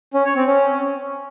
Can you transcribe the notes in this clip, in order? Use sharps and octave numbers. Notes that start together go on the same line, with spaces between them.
C#4
C#5
C4
C#4